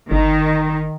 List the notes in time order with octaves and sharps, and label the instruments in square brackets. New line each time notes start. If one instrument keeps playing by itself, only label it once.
[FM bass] G1 [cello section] D#3 [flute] D#4